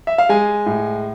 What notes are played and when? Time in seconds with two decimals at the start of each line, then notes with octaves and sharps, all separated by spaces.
0.07 E5
0.18 F5
0.29 G#3 G#5
0.66 A2